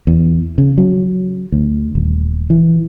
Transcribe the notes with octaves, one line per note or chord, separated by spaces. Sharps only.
E2
C#3
F#3
D2
D#1
E3